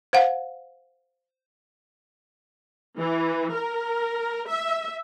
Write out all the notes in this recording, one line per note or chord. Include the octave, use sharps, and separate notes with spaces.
C5 F5 F#5
E3
A#4
E5